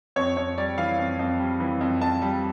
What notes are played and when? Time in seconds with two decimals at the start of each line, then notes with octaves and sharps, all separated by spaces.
0.16 F2 C#5
0.37 F2 C#5
0.58 G3 D5
0.78 E3 F5
0.99 F2
1.19 F2
1.39 G3
1.60 E3
1.81 F2
2.01 F2 A5
2.22 G3